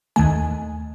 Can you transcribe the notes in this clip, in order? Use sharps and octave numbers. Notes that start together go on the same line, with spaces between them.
D#2 D#3 A3 G#5